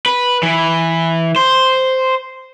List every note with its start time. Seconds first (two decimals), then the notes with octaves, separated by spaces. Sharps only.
0.06 B4
0.43 E3
1.36 C5